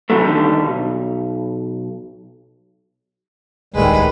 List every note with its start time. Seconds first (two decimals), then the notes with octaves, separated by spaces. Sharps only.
0.10 D#2 C3 E3 F#3 A3
0.25 D#2 G#2 D3 D#3 G3
0.66 B1
3.74 D#1 C#2 A2 D#3 G3 G#3 D4 B4